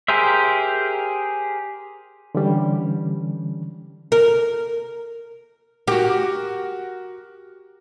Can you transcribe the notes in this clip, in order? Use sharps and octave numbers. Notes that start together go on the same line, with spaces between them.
G4 G#4 A#4 C5 E5
D3 E3 G3 C#4
A#4
F#4 G4 A#4